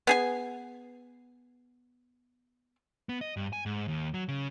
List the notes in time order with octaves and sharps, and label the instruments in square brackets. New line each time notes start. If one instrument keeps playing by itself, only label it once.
[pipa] B3 G#4 G#5
[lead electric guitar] B3
D#5
G2
G#5
G#2
D#2
F#3
C#3